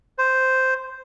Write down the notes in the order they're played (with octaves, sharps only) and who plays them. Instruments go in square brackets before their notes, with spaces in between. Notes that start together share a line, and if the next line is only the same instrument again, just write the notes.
[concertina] C5